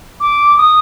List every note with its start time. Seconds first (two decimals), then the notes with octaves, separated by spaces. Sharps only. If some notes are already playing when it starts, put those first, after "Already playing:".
0.20 D6
0.58 D#6